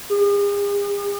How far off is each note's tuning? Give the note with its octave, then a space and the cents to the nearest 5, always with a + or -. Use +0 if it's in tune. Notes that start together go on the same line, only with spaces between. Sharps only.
G#4 -45